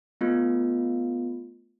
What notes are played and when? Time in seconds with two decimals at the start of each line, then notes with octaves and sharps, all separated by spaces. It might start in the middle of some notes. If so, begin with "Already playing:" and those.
0.21 A3 B3 F4